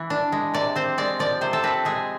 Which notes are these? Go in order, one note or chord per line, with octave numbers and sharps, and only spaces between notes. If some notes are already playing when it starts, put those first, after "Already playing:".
Already playing: E3
D4
G#3
C3 D5
C4 C5
G#3 D5
F3 D5
C3 C5
A4
C4 B4
G#3 G#4